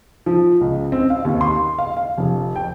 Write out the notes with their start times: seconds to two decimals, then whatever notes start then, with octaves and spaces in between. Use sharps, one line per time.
0.26 F3
0.61 C#2
0.92 C4
1.10 F5
1.25 D#2
1.41 C6
1.78 F5
1.97 F5
2.17 F1
2.56 G5